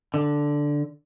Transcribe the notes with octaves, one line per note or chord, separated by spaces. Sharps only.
D3